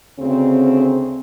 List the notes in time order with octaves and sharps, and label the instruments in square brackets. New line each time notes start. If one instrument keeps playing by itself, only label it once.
[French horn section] D2 C#3 C4